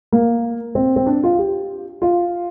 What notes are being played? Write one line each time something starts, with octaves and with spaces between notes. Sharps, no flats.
A#3
C4
C4
D4
F4
G4
F4